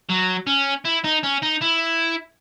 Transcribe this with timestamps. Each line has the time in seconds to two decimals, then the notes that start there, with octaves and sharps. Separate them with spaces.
0.09 F#3
0.47 C#4
0.85 E4
1.04 D#4
1.23 C#4
1.42 D#4
1.61 E4